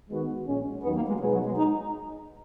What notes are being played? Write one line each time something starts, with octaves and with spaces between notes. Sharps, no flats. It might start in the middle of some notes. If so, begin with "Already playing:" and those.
D#3 G#3 B3 F#4
A#1 A#2 G#3 C#4
D#2 D#3 F#3 B3
A#3
G#3
B2 F#3 G#3 D#4 G#4 B4
F#3
G#3
D#4